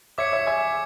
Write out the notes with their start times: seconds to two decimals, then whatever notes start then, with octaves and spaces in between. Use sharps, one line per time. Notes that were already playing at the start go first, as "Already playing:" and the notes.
0.18 C#5 E5 D6 G#6 C#7
0.32 C#5 E5
0.47 E5 G#5